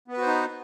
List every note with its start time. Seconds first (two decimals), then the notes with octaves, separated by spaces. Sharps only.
0.08 B3
0.12 B4
0.17 F#4
0.22 C5
0.27 D#4